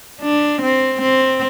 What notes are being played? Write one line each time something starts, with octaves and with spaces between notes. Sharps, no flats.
D4
C4
C4